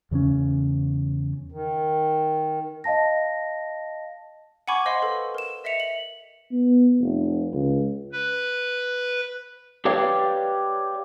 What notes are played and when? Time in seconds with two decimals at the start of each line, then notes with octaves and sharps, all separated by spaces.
0.11 E2 C#3 A3 C#4
1.52 D#3
2.84 D#5 F5 A5 A#6
4.68 F#5 G#5 B5 C#6 D6 G#6
4.85 C5 D#5 F5 C6
5.02 A4 B4
5.35 A#4 E7
5.64 D#5 E5 B6 C#7 F7
5.80 F#7
6.52 B3
7.01 F1
7.54 C#2
8.12 B4
9.85 G4 B4 C#5 D5 F5 G5